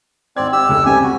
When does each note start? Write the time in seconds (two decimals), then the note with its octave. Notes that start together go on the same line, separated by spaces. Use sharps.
0.37 G#1 C4 D5 G#6
0.53 G4 E6
0.68 F1 C#2 A3
0.86 C#3 G3 C4 G#5
1.04 F#4